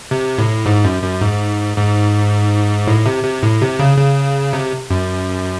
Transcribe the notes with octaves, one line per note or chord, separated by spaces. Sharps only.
C3
A2
G#2
F#2
F#2
G#2
G#2
A2
C3
C3
A2
C3
C#3
C#3
C3
F#2